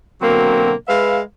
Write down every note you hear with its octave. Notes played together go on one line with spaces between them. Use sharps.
B2 D3 F#3 A#3 C4
G#3 B4 E5 F5